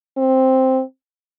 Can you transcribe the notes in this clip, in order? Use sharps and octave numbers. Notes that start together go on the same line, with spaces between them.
C4